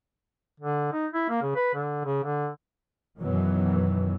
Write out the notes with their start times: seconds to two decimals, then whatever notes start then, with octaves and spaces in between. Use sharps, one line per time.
0.60 D3
0.93 D#4
1.13 E4
1.29 A#3
1.42 C#3
1.56 B4
1.74 D3
2.04 C#3
2.24 D3
3.19 F#2 B2 D#3 E3 F#3